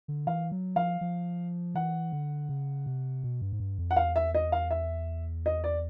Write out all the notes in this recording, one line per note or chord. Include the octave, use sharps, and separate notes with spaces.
D3
E3 F5
F#3
F3 F5
F3
E3 F#5
D3
C#3
C3
B2
G2
G#2
G2
F2
F#5
E2 F5
E5
D#5
F5
E5
D#5
D5